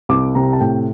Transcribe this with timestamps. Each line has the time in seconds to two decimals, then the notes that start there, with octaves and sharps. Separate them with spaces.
0.09 C2 D6
0.35 C3 A#5
0.53 A5
0.60 A2 G5